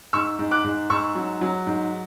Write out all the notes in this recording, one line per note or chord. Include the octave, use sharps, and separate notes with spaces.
G#2 C#6 E6
G#2
D6 F#6
G#2
G#2 C#6 E6
F#3
F#3
G#2